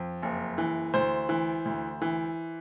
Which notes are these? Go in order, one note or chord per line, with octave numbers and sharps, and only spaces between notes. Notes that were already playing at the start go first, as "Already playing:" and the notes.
Already playing: F2
F#1
E3
D2 C5
E3
D2
E3